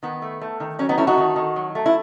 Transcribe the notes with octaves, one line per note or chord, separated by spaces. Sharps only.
D#3 B3
A3
A3
D#3
F#3 C#4
B3 D#4
A3 C#4 E4
D#4 F#4
D#3
D#3
F#3
A3
E4